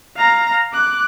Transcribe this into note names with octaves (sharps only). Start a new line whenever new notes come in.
F5 A#5
D6 F#6